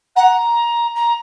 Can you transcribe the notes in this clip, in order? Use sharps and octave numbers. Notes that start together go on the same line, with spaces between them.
F#5 A#5
A#5